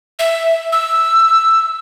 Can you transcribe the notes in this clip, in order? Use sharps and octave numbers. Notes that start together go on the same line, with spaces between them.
E5
E6